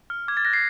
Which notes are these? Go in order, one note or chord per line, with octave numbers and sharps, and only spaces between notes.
F6
D6 G#6
A6
F#6 A#6
C7